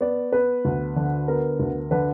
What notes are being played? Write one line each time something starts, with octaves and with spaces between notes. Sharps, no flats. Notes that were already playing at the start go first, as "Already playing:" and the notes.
B3 D5
B3 B4
D2
D3
B3 A#4
D2
D3 B4